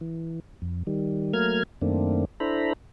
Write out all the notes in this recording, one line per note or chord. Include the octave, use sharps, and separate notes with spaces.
E3
F2
D#3 G3
F#3 A3 A#3 A#4 F6 G#6
F#2 D#3 A3 A#3 C4 D4
D4 E4 A4 C5 A#5 B5